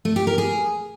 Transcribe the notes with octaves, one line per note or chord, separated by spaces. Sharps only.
A3
G4
A#4
G#4